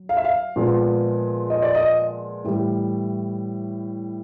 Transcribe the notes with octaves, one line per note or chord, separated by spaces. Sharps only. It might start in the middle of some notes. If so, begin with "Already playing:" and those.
Already playing: F#3
F5
E5
F5
A#2 F3 G#3 B3
D#5
D5
D#5
A2 E3 G3